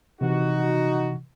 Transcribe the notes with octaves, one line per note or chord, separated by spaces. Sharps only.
C3 E3 D#4 F#4